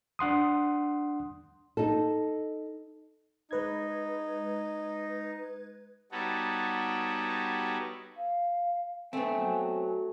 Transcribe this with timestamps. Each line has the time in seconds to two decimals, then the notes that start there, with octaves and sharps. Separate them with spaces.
0.19 D4 F#5 C6 D#6
1.77 D#4 A4
3.51 G#3 D#4 B4 G#6
6.12 G3 B3 D#4 F#4 A4 C#5
8.17 F5
9.13 A3 B3 C4 G#5
9.38 F#3